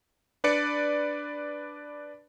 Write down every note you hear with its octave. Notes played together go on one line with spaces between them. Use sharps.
D4 B4 D5 C#7